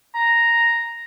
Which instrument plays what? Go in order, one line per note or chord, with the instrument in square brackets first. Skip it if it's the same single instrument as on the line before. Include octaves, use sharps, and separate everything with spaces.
[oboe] A#5